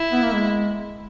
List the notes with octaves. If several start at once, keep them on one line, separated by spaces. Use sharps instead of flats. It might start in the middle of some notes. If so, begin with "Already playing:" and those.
Already playing: E4
B3
A#3
G#3